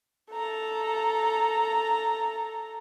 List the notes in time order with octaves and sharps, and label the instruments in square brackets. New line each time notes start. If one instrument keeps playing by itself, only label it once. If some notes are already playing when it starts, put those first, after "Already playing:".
[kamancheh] A4 A#5